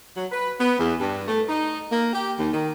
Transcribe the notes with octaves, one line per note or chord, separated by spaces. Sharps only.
F#3
B4
B3
E2
G2
A3
D#4
A#3
G4
D#2
D#3